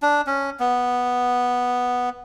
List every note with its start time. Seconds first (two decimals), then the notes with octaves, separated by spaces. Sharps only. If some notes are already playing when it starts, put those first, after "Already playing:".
0.02 D4
0.27 C#4
0.60 B3